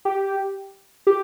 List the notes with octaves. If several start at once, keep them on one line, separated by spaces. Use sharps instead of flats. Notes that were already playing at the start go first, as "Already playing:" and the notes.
G4
G4